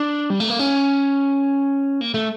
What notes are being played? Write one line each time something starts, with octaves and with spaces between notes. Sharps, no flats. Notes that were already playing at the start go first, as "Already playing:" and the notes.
Already playing: D4
G3
A3
A#3
C#4
A#3
A3